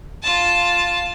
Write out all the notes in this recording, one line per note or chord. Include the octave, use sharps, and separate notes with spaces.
F4 A5